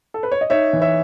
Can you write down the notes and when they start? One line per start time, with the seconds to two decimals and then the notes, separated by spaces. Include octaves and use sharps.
0.14 A4
0.23 B4
0.32 C#5
0.41 D#5
0.50 D#4 C#5 E5
0.73 E3
0.81 C#5 E5